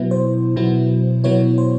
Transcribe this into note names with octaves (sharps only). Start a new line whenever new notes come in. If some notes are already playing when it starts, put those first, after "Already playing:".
Already playing: B2 F#3 B3 E4
C5
B2 F#3 B3 E4
B2 F#3 B3 E4 C#5
C5